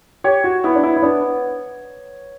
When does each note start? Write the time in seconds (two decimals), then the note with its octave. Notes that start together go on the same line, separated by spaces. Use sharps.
0.24 G4 C#5
0.44 F#4
0.64 B3 E4
0.75 D4
0.83 E4
0.96 E4
1.02 B3 D4